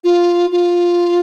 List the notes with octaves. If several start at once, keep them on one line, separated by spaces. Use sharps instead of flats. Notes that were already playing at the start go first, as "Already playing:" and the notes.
F4
F4